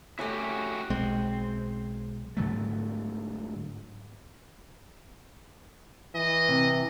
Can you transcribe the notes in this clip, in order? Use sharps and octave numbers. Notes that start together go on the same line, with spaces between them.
A3 C#4 E4 F#4 G4
B1 G#3 C4
G#2 D3 F#3 A3
E3 D#5
C3